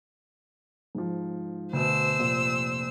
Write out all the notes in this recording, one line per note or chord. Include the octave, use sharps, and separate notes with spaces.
G#2 F3
D2 B2 C5 E6
F1 A#2